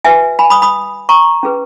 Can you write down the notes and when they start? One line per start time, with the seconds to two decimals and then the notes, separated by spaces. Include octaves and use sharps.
0.05 F#4 B4 E5 G#5
0.39 G#5 B5
0.50 B5 D#6
0.62 B5 D#6
1.09 A#5 C#6
1.43 C#4 G#4 B4